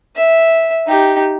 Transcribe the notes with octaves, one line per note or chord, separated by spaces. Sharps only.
E5
D#4 G4